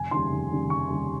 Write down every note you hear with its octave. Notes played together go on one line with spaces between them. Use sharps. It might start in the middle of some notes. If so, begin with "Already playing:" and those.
Already playing: F1 G#5
D#2 C#3 G3 C6
F1
D#2 C#3 G3
F1 C#6
D#2 C#3 G3